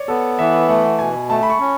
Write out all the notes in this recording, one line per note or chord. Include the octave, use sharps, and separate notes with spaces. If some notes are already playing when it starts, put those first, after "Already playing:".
Already playing: C#5 D5
B3 A4
E3 E5
A3 F#5
B2 G#5
A3 A5
B5
C#6
C#4